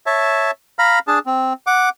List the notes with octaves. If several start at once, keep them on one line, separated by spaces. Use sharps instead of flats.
C#5 E5 A5
F5 A#5 B5 F6
D4 G#4 A5
C4
F#5 D6